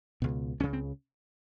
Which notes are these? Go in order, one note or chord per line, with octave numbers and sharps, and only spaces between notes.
C#2 B2
C#2 C#3 C#4
C4